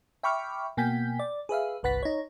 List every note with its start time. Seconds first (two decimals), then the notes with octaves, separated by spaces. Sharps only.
0.23 E5 G5 B5 C#6 D6 F6
0.77 B2 A#3 G5 G#5 G6 B6
1.19 D5
1.49 G#4 B4 E5 F5
1.83 G1 C2 B4 F#5 A6 B6
2.03 D#4 C#5